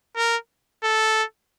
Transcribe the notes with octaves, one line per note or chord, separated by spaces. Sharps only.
A#4
A4